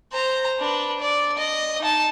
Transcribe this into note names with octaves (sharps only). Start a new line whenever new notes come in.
C5 A#5
D4 B4
D5
D#5
D#4 A5